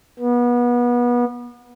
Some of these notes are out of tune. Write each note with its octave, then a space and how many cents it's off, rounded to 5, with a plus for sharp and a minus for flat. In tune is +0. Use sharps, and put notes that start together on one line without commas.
B3 -30